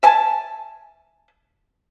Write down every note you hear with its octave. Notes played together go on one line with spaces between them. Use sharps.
E5 G#5 A5